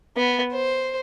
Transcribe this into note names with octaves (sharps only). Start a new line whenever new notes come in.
B3
C5